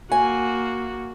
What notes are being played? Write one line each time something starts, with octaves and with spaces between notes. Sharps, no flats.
A#3 F#4 G#5